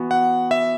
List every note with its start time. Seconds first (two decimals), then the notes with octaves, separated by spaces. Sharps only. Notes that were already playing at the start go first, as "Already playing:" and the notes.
Already playing: E3 B3 F#4
0.11 F#5
0.51 E5